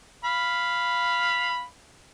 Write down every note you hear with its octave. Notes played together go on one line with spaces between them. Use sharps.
F5 B5